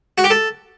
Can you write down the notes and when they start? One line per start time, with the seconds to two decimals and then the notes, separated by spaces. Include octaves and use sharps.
0.18 F#4
0.24 G4
0.30 A4